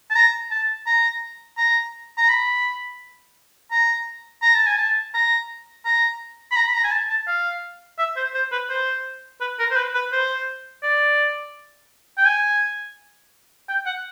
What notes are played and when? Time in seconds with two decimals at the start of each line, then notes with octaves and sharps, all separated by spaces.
0.11 A5
0.15 A#5
0.51 A5
0.87 A#5
1.58 A#5
2.18 A#5
2.29 B5
3.71 A#5
4.42 A#5
4.55 A5
4.67 G#5
4.78 A5
5.14 A#5
5.85 A#5
6.52 B5
6.56 A#5
6.67 B5
6.74 A#5
6.84 G#5
6.92 A5
7.10 A5
7.28 F5
7.99 E5
8.17 C5
8.35 C5
8.52 B4
8.70 C5
9.41 B4
9.59 A#4
9.71 C5
9.77 B4
9.95 B4
10.12 C5
10.83 D5
12.18 G5
12.26 G#5
13.69 G5
13.86 F#5